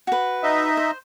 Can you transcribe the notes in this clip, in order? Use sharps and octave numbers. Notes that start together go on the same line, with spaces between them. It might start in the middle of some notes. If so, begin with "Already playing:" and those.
F#4 B4
D#4 D#5 E5
C5